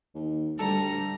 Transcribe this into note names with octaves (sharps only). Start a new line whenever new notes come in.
D#2
D2 G3 A4 A#5